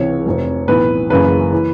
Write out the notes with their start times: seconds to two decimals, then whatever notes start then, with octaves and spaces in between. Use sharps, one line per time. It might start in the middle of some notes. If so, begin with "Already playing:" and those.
Already playing: C#2 C3 E3 C#5
0.26 F1 F2 C3
0.68 B1 A2 E3 B4
1.10 F#1 F#2 C#3 E3 B4
1.52 E3